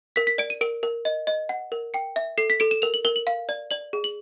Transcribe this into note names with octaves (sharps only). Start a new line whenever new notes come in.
A#4 B6
B6
D5 D7
D#7
A#4 D7
A#4
D#5
D#5
F#5
A#4
G5 C#7
E5
A4 C7
B6
A4 D7
E7
A#4 F7
F#7
A#4 G7
F#7
F5
D5
D5 F#7
G#4
F#7